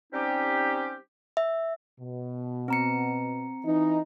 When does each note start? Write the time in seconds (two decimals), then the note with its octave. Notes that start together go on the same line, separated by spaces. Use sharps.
0.13 G3 C4 C#4 D#4 G4
1.37 E5
2.00 B2
2.68 C4 A#5 C#7
3.66 E3 D#4